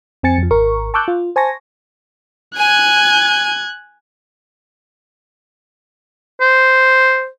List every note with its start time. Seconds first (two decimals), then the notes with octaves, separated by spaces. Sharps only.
0.23 F2 C4 G#5 A6 C#7
0.38 F2 F3
0.51 G#1 A#4 C#6
0.94 A5 C#6 D6 E6 F#6 G6
1.08 F4
1.36 C5 G#5 A5 C#6 A#6
2.57 G#5 F#6 G#6
6.41 C5